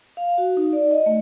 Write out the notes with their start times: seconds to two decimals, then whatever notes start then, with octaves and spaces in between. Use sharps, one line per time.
0.17 F5
0.38 F#4
0.57 D#4
0.73 D5
0.91 D#5
1.06 A3